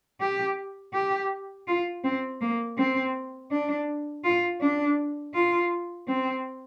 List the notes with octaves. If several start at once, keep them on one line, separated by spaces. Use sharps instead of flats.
G4
G4
F4
C4
A#3
C4
D4
F4
D4
F4
C4